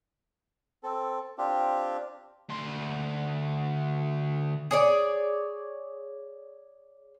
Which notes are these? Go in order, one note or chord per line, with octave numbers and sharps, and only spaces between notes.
C4 A4
C4 D4 F4 G4
D2 C6
G#4 C#5 D5